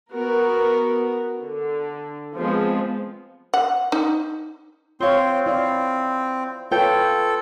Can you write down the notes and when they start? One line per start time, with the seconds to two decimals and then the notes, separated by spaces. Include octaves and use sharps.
0.11 B3 F#4 A#4
1.40 D3
2.36 F3 G#3 B3 C4
3.54 F#5
3.92 D#4
5.00 C4 F4 C5 C#5 F5
5.46 C4 E4 D5 F5
6.72 F4 A4 B4 C#5 G5